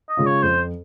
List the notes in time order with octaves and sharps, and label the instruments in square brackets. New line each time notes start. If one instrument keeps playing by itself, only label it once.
[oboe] D#5
[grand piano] C#3 G#3 C#4 F4
[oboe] C#5
[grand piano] F2 [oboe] C5